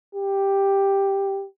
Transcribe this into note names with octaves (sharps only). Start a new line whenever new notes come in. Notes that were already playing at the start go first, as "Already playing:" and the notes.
G4